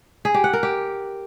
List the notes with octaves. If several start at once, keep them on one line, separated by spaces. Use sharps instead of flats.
G#4
G4
F#5
A#4
G4